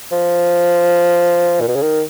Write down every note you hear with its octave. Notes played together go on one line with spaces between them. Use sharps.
F3
A#2
B2
C#3
D#3